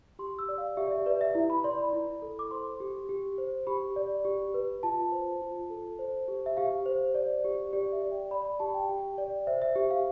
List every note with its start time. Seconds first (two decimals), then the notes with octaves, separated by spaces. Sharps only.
0.19 G4 C6
0.39 E6
0.49 D5
0.58 F5
0.77 G4 E5
0.87 D5
0.91 E5
1.06 B4 D5
1.21 E5
1.35 E4
1.50 B5
1.64 D5 C6
1.79 B5
1.93 E4
2.22 A4
2.39 D6
2.51 C5 C6
2.80 G4
3.09 G4
3.38 C5
3.67 G4 B5
3.96 D5
4.25 G4
4.54 B4
4.83 F4 A5
5.12 C5
5.42 F4
5.70 A4
5.99 C5
6.28 G4
6.46 E5
6.57 G4 F5
6.86 C5
7.15 D5
7.44 G4
7.73 G4 D5
7.92 E5
8.02 D5
8.12 G5
8.31 D5 B5
8.46 B5
8.60 G4 A5
8.74 G5
8.89 G4
9.18 D5
9.47 C5 E5
9.62 E5
9.76 G4 E5
9.91 F5